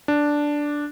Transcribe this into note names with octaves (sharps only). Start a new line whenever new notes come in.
D4